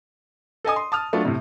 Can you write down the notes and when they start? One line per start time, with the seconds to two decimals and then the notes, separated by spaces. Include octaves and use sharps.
0.64 A4 D#5 G#5 D#6
0.76 C6
0.92 A5 D#6 F6
1.13 F#3 A3 D4 F4
1.25 A2 C3